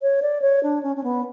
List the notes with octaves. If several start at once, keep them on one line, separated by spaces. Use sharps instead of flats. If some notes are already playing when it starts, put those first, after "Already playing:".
C#5
D5
C#5
D4
C#4
C#4
B3